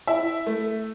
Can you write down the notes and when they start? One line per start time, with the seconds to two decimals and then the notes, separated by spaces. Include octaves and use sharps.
0.07 E4 E5
0.47 A3